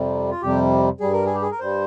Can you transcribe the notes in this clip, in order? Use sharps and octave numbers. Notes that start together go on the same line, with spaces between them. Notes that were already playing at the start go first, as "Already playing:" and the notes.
Already playing: F2 C3 G3
F4
F2 C3 G3 G4
G2 G3 G#4
A#4
G#4
G4
G#4
A#4
G2 G3 C5